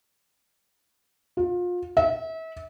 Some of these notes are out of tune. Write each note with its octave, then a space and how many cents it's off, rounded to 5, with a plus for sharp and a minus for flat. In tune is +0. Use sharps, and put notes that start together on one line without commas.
F4 +30
E5 -35